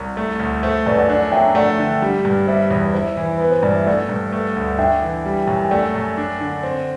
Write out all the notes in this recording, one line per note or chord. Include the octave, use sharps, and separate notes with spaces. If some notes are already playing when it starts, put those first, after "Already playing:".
Already playing: C2
A3
D2
A3 C5 E5
F#2 B4 D5
D5 F#5
D4 D5 F#5
F#3 E5 G5
A3 D5 F#5
D3
G3
G2
G3 C5 E5
E2
E4 C5 E5
E3
B3 B4
C5
G2 D5
E5
A3 D5 F#5
G2
A3
D2
D4 E5 G5
E3
G3
F#2
G5
A3 D5 F#5
F#2
D4
D3
C4